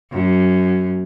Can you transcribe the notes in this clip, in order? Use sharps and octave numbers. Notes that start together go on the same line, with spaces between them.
F#2